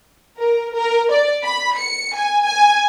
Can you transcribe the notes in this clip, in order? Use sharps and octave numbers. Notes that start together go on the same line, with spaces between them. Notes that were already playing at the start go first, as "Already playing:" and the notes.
A#4
A#4
D5
B5
C#7
G#5
G#5